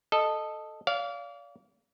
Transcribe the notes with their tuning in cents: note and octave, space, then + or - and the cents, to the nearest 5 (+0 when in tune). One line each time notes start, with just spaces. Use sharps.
A4 +0 D#5 -10
D5 -40 F5 -5